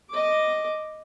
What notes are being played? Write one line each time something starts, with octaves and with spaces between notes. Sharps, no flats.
D#5 D6